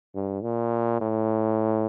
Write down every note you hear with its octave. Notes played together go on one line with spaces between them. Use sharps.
G2
A#2
A2